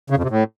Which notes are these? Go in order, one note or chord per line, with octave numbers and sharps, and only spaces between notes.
C#3
F2
C3
A2